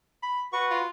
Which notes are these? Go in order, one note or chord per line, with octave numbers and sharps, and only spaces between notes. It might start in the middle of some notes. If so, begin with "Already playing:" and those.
B5
F#4 B4 F#5 C#6
F4